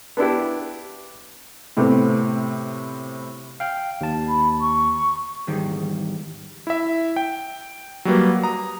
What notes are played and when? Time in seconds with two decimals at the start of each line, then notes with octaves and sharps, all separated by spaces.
0.17 B3 D4 E4 G4
1.77 A2 C3 A3 B3 C4
3.60 F5 G5
4.01 D#2 A5
4.28 B5
4.60 C#6
5.47 E2 G#2 D#3 G3
6.67 E4 E5
7.16 G5
8.05 F#3 G3 A#3 B4
8.43 A#5 D#6